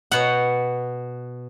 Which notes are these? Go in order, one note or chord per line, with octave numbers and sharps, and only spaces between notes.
B2 F#5